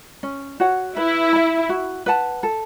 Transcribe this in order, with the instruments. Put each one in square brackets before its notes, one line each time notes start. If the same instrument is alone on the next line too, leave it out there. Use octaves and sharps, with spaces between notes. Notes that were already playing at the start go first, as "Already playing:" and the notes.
[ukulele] C#4
F#4 C#5 F#5
[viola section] E4 [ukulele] B4
[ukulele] E5 B5
F#4
B4 F#5 A5
A4